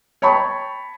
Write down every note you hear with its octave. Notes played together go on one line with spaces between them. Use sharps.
C#5 G5 A5 B5 C#6